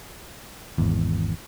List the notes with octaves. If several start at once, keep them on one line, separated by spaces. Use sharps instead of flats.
G#1 E2